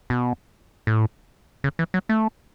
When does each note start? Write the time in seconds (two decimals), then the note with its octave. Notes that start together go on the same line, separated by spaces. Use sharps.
0.10 B2
0.87 A2
1.64 C#3
1.79 E3
1.94 F#3
2.09 A3